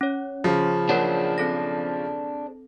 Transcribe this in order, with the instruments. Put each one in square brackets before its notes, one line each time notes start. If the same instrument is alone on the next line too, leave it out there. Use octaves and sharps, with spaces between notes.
[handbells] C#4 C#5
[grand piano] C#3 F3
[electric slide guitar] D4 G#4 C5 [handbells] A#4 C#5 F#5
[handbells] C4 A4 A#6